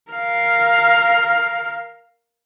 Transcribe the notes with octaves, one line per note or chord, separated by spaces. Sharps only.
A#4 F5